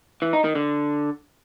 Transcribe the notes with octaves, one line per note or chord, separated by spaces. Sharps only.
E3
D#4
D#3
D3